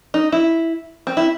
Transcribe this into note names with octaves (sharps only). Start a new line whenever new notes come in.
D#4
E4
C4
E4